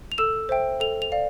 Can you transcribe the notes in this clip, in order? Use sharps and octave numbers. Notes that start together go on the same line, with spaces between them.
F7
A4 E6 E7
C5 E5 G5
A4 F7
F7
D5 F5